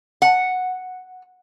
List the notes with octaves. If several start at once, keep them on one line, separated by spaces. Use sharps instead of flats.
F#5